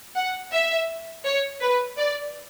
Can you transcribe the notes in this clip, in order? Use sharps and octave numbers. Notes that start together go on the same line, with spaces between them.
F#5
E5
C#5
B4
D5